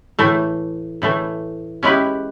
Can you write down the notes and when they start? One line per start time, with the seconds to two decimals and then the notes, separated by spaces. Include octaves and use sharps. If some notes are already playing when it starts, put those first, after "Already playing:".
0.19 A2 E3 A3
1.02 A2 E3 A3
1.83 G#3 C#4 E4 G4 B4